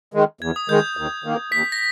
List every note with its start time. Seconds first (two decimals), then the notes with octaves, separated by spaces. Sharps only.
0.14 D#3 G#3
0.41 E2 G#6
0.56 D#6
0.69 D#3 G#3 G6
0.97 D#2
1.24 D#3 A#3
1.52 D#2 B6
1.72 A#6